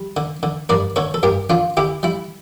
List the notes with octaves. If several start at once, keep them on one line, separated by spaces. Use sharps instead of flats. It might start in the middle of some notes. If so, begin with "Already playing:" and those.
Already playing: G3
D3
D3
G2 A#4 D5
D3 A4 C#5
A4
G2 G4 A#4
D3 D4 F4
D3 E4 G4
G3 E4